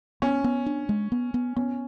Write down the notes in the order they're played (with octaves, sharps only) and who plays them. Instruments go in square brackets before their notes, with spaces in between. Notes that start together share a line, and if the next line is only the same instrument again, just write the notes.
[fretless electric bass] B3 [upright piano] C#4
[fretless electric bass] B3
D4
G#3
B3
B3
[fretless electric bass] B3 [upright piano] C#4